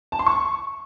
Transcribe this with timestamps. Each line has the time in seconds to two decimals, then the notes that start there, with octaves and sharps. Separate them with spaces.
0.12 A5
0.19 C6
0.26 C#6